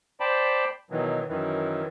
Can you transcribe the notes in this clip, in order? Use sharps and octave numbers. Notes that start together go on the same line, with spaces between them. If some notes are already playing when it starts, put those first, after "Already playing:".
C5 D5 G5 A5 B5
B2 D#3 E3 F#3
F#2 D#3 E3